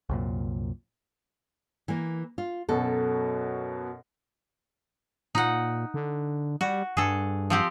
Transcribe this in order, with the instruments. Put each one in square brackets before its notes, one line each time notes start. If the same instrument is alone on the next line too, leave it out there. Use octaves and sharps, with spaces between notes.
[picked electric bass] C2 F#2 A#2
[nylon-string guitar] E3 A#3
F4
[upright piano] F#2 B2 F#3 [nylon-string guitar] A4
[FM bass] A#2 [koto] D#4 F#5
[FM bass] D3
[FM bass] G3 [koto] F#4
[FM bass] G2 [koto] G#4 A4
[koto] F3 C4 G4